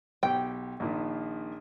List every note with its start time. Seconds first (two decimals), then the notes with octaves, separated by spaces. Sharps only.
0.23 B1 G4 G5
0.80 A#1 A#2 D#3